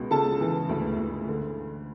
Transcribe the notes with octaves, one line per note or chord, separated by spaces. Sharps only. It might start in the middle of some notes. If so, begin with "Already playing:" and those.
Already playing: C#2 B2
C#3 A4 A5
E3
D2
D2
D3